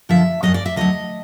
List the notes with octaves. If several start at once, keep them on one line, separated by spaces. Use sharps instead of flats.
F#2 D3 F3 E5
F#2 D#3 F#3 D#5
D5
E5
D2 D3 F#3 D#5